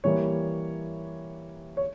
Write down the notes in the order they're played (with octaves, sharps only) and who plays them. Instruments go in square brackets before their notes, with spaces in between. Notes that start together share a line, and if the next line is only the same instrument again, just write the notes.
[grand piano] E3 G3 A#3 C#5
C#5